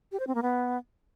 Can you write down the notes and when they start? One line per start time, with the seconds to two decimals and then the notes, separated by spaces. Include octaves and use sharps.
0.12 G4
0.20 C5
0.27 C4
0.35 A#3
0.43 B3